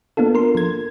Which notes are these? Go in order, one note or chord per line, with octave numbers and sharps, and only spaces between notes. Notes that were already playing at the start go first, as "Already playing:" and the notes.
A#3 B3 D4 F4 A4
A#4 C6
F3 G#6